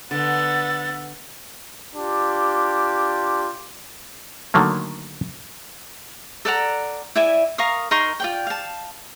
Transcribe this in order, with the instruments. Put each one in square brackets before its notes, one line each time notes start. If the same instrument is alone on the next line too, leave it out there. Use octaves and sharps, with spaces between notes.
[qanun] D3 [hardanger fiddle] B3 [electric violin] F#5 E6 [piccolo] A6
[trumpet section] D4 F4 G4
[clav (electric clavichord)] D3 D#3 F#3 A3 A#3
[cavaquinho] A4 D5 F#5 A#5
E4 D5 E5 G#5
A#4 F5 C#6 D#6
D#4 A#4 C6 C#6
F4 D5 G5
F5 A5